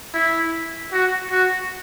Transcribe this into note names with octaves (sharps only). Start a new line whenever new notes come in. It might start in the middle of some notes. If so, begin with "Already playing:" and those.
E4
F#4
F#4